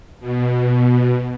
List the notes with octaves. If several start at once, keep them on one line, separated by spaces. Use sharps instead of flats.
B2